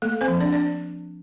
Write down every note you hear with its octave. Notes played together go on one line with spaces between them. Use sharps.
A3 A#3 A4
C4 C5
F3
D4 D5
D4 D5